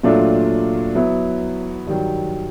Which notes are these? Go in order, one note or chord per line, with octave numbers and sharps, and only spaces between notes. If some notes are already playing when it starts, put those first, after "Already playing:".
A#2 F#3 A3 D4 F4
F#3 B3 E4
G2 D#3 F#3